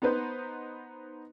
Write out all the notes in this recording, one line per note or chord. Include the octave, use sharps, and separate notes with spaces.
B3 D#4 B4 C5